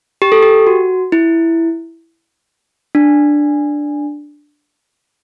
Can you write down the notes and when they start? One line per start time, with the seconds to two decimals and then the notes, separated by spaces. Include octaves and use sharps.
0.22 G4
0.32 A4
0.43 G4
0.67 F#4
1.12 E4
2.95 D4